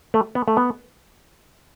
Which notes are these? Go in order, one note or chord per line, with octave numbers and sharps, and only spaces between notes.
A3
B3
A3
B3